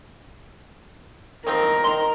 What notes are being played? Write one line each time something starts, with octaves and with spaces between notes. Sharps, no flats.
D#3 F3 C4 A#4
D#3 C6